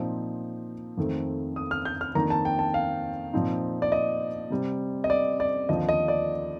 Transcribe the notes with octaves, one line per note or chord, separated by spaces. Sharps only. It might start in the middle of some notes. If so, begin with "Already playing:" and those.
Already playing: A#2 F3 C4 D#4
F2 D#3 A3 C4
D#6
F6
G6
F6
F2 D#3 A#3 D4 A#5
A5
G5
A5
F5
A#2 F3 C4 D#4
D5
D#5
C3 G3 C4
D#5
D5
D5
D#2 D3 F3 C4 D#5
D#5
D5